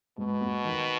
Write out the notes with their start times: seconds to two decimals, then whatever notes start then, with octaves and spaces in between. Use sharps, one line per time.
0.18 G#2 B2
0.41 B3
0.65 D#3